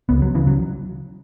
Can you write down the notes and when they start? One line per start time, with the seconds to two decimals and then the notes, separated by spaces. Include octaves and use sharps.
0.09 C#2 B3
0.22 F#3
0.35 C#3 E3
0.47 F#3